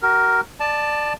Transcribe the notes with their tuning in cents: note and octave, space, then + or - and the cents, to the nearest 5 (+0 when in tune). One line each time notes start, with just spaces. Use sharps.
F#4 +35 A#4 +0
D5 +20 A5 +0